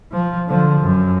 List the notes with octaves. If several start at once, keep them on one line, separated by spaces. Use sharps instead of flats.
F3
D3 F3
F#2